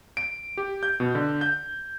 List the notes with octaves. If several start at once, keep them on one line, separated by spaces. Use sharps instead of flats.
D7
G4
G6
B2
D3
G6